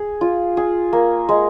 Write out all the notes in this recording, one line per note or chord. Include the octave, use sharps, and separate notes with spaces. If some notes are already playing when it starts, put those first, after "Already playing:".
Already playing: G#4
F4
G#4
A#3
G#3